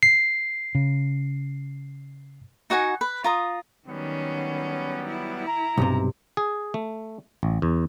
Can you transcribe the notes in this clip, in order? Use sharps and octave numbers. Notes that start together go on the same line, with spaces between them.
C7
C#3
D#4 F#4 F#5 G#5
B4
F4 A#5 D#6
D#3 F#3 G3 B3 C#4
E4
A#5
B1 G2 C3
G#4
A3
A1
E2